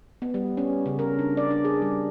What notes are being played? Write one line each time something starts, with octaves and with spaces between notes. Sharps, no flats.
B3
G3
C#4
C#3
A#4
D4
D5
D4
G#4
G3